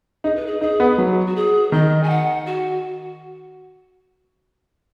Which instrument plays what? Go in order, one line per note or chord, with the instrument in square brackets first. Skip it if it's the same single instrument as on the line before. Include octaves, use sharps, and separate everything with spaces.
[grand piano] D#4 [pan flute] G#4
[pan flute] B4
G#4
[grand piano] D#4 [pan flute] G#4
[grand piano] B3
F#3
[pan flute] F#4
G#4
[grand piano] D#3 [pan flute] D#5
[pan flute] G#5
F#5
F#4